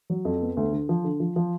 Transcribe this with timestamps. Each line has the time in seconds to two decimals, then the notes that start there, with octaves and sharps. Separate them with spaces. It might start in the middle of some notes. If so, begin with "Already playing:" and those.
0.10 F#3
0.25 F2
0.42 B3
0.57 D2
0.73 D3
0.89 F3
1.04 D3
1.20 F3
1.36 F3